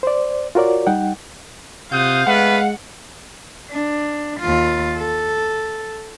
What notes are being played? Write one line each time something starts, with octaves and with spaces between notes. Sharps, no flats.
C5 D5
F4 F#4 A#4 C#5 D5
G3 D#4 F#5 G5
C3 F4 F5 F#5 D#6 G6
G#3 A3 B3 B4 F#5
D4
D#2 F4
A4